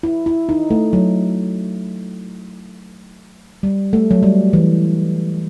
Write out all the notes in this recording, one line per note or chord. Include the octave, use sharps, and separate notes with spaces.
E4
E4
D#4
A3
F#3
G3
A3
F#3
G3
E3